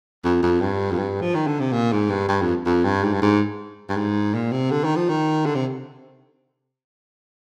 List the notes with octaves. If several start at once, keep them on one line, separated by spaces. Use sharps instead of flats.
F2
F2
G2
F2
G2
F3
D#3
D3
C3
A#2
G#2
G2
G2
F2
F2
G2
G#2
G2
G#2
G2
G#2
A#2
C3
D3
D#3
F3
D#3
D3
C3